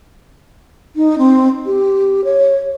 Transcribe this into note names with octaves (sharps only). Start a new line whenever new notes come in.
D#4
C4
G4
C#5